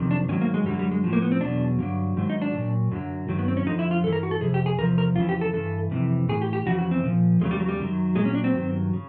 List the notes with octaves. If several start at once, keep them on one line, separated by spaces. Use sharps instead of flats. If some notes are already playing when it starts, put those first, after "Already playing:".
Already playing: F2 C3 D#3 F#3
D4
G#2 D#3 F#3 C#4
A#3
G#3
F#2 D3 F#3 G3
G3
G#3
A2 F3
A#3
B3
C4
E2 B2 F#3 D4
G2 D3 F#3
G#2 D#3 F#3
D#4
D4
A#2 F#3
F#2 D3 F#3
G2 D#3 F#3
B3
C4
C#4
F2 D3 F3 D#4
E4
F4
G2 E3 A4
A#4
F#4
A4
F2 C3 G#4
G4
G#4
E2 C3 F3 A#4
A#4
F2 C#3 E3 F4
G4
A4
G2 E3 A4
F2 C3 E3
A2 E3 G#4
G4
G4
F2 C#3 E3 F#4
F#4
C4
A#2 F3
E2 C#3 F#3 G#3
G3
F#3
G3
F#2 D#3 F#3
A#2 F#3 G#3
C#4
D4
C4
G2 D#3 F#3
C#3